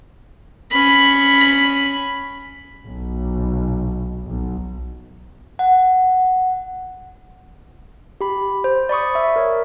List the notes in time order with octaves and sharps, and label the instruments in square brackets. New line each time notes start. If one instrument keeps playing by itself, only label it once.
[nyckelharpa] C#4 B5
[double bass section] B1
B1
[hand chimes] F#5
[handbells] G4 B5
C5
D5 B5 C#6 D#6
E5
A#4 C#5